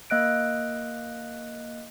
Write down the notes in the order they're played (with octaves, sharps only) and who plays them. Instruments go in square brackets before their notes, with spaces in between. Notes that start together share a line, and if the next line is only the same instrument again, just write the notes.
[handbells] A#3 D#5 F#6 D7